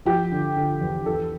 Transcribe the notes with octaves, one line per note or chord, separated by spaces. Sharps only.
F3 G4
D3
D3
E2
E2 A4